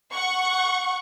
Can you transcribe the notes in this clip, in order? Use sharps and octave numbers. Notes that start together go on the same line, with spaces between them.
F#5 C#6